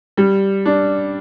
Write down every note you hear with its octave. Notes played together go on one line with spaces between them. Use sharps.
G3
D4